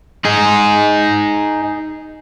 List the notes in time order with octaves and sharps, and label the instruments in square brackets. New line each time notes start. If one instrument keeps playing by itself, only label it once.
[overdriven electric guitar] D#4 G#4